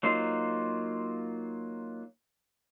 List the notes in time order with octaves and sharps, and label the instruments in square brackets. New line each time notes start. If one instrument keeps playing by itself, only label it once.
[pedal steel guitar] F#3 A#3 D#4 F4 C5